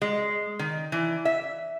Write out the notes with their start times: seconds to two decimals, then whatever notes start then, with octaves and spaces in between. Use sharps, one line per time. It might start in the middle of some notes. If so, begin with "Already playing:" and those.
0.02 G#3
0.59 D#3
0.92 E3
1.25 E5